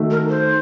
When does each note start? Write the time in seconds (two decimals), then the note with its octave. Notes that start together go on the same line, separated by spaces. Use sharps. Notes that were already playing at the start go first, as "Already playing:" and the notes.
Already playing: D#3 A3 D#4 F#4
0.11 A#4
0.29 C5